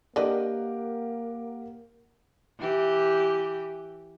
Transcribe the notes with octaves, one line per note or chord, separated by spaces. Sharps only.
A#3 D4 G4 A#4 B4 D#5 F#5
E3 G4